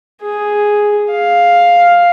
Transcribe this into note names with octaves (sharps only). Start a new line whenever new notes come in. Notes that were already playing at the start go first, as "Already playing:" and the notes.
G#4
F5